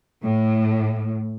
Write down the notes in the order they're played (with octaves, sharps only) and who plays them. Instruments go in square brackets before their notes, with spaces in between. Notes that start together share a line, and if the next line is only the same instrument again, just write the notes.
[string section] A2